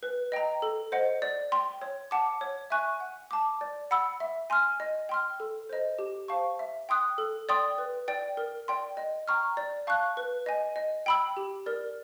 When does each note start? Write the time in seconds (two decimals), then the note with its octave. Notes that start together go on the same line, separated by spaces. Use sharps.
0.03 B4
0.32 D#5 G5 A#5
0.62 A4
0.92 C5 D#5 F#5
1.22 D5
1.52 G5 C6
1.81 C#5
2.11 F#5 A5 D6
2.41 C#5
2.70 E5 G#5 C#6 F#6
3.00 F#5
3.31 A5 D6
3.61 D5
3.91 F#5 B5 E6
4.20 E5
4.50 G#5 C6 F6
4.80 D#5
5.09 G5 C6 F6
5.40 A4
5.69 C5 D#5
5.99 G4
6.28 C5 F5 A5 C#6
6.59 E5
6.89 G5 C6 D#6 F#6
7.18 A4
7.49 D5 G5 C6 D#6
7.78 B4
8.08 D5 G5
8.37 A#4
8.68 D5 G5 C6
8.97 D#5
9.28 G5 A#5 C#6 F6
9.57 D5
9.87 F5 A5 C#6 F#6
10.17 B4
10.46 D#5 G#5
10.76 D#5
11.06 G5 B5 E6
11.37 G4
11.66 A#4 D5